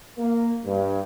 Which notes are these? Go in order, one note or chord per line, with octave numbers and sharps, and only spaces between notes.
A#3
G2